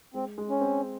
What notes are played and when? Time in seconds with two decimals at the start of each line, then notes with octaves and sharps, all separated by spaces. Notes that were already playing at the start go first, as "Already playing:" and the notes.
0.14 G#3 C4
0.38 G#3
0.50 C#4
0.61 C4